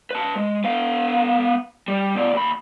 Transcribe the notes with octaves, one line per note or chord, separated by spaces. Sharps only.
B4 A5
G#3
B3 F5
G3
B2 D5
D#2 B5